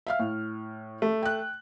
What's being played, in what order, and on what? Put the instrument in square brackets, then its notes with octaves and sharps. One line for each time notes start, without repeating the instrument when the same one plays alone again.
[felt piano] E5 F5 F6
A2
[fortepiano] A3
[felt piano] G5 F#6